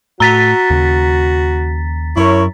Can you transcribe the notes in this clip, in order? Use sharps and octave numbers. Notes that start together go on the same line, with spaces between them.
A2 F#4 A#5 A6 B6
D#2 C#3
F#2 E4 A#4 C#5